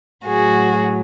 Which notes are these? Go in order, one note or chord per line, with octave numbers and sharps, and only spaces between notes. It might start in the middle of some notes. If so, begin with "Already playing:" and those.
A2 F#3 F#4 G#4